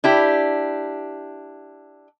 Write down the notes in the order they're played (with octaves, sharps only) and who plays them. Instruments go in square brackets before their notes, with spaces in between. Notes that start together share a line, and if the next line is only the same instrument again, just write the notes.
[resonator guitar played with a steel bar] D4 E4 G4